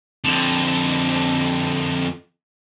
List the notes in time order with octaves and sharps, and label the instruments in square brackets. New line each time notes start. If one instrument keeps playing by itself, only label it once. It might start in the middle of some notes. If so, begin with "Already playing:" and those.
[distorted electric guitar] F2 D3